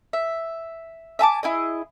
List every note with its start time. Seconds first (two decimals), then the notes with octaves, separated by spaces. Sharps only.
0.13 E5
1.19 E5 G#5 A5 D6
1.43 E4 G#4 D#5